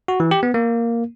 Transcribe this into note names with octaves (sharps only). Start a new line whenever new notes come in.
F#4
E3
G4
B3
A#3